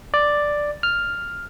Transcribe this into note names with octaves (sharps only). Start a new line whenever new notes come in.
D5
F6